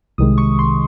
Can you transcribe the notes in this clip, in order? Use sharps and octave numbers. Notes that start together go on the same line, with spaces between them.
C2 C3 D#3 G#3 D#6
C#6
C6